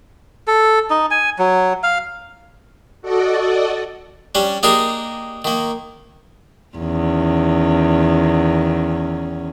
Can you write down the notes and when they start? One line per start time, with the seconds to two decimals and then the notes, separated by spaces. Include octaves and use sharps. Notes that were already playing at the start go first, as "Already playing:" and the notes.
0.47 A4
0.90 D#4
1.11 G#5
1.39 F#3
1.83 F5
3.02 F#4 A4 D5 D#5
4.35 G3 C#4 D4
4.63 A#3 D4 D#4 G4 G#4 A#4
5.45 D#3 A#3
6.77 E2 D#3 C#4